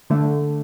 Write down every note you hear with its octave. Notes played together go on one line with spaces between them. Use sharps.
D3 A3